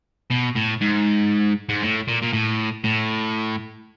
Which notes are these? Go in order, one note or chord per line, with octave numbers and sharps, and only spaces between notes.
B2
A2
G#2
G#2
A2
A#2
A#2
A2
A2